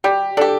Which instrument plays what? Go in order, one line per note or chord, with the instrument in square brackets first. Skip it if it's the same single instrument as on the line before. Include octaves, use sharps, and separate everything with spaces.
[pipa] G3 [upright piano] G4
[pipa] D4 G4 [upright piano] A4